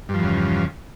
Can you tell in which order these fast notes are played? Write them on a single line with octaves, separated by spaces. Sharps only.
G2 F3 E2 C#3